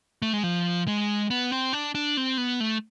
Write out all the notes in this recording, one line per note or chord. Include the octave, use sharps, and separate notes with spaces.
A3
G#3
F3
G#3
B3
C4
D4
D4
C4
B3
A3